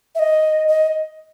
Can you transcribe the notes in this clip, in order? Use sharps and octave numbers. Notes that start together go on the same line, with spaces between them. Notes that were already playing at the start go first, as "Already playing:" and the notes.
E5
D#5
D#5